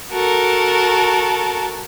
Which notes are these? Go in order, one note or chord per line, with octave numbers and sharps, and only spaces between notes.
F#4 A4 A#4